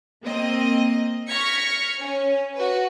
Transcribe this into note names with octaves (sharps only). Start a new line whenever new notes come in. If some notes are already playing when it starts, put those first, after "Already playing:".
A#3 C4 D#5
C#6 F6 G#6 A#6 B6 C#7
C#4
F#4 B4